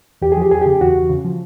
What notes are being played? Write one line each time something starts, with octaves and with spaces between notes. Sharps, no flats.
E2 G4
F3 G#4
G4
E2 G#4
C#3 G4
E2 F#4
E2
C#3
F3